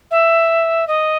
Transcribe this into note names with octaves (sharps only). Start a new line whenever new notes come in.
E5
D#5